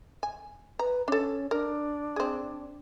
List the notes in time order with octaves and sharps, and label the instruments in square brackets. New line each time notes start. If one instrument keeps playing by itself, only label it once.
[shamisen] G#5
[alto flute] B4 [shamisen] A#5
[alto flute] C#4 [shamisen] D4 A4
[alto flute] D4 [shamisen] A#4
[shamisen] C4 G#4